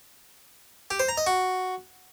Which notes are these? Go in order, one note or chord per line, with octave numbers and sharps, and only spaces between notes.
G4
C5
A#5
D#5
F#4